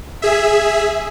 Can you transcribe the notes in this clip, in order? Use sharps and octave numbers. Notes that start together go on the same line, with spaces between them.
G#4 E5